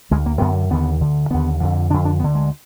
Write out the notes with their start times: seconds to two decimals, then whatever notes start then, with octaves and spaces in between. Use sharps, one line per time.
0.11 D2 D3 G#3
0.26 A#3
0.40 F#2 D3 B3
0.70 D#2 D3 B3
1.01 D2 D3
1.30 D#2 D3 B3
1.61 F2 D3
1.90 D3 D4
1.94 F2
2.05 D4
2.20 D2 D3 B3
2.35 G#3